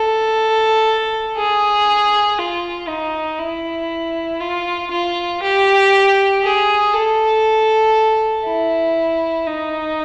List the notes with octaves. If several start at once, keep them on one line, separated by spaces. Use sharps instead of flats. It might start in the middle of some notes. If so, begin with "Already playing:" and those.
Already playing: A4
G#4
F4
D#4
E4
F4
F4
G4
G#4
A4
E4
D#4